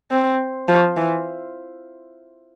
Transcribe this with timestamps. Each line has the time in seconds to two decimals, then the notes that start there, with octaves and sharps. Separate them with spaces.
0.11 C4
0.68 F3
0.97 E3